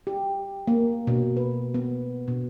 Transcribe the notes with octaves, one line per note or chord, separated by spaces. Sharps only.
G4
A#3
B2
B4
B3
B2